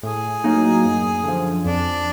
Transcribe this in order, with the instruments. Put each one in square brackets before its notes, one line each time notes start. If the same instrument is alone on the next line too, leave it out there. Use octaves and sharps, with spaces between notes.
[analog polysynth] A2 [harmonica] G#4
[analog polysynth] F#3 A#3 D#4
F#2
D3 F3
[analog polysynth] F2 [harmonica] D4